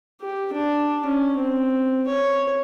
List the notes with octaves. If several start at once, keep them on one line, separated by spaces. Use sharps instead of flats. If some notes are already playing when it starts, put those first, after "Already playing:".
G4
D4
C#4
C4
C#5